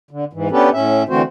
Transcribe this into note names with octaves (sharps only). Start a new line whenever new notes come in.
D3
G#2 E3
B3 C#4 D4 G4 A4 B4
A2 C#4 E5
D3 E3 A3 C4 F#4 C5